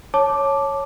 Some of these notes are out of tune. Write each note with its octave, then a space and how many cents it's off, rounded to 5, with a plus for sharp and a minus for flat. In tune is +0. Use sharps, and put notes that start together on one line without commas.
C#5 -5 A5 -10 D6 +0